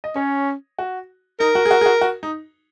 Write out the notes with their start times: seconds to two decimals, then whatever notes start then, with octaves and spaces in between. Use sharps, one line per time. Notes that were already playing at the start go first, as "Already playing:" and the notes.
0.04 D#5
0.16 C#4 C#5
0.79 F#4
1.40 D#4 A#4
1.55 F#4
1.65 G#4
1.71 F#4
1.81 G#4
1.86 F#4
2.01 F#4
2.23 D#4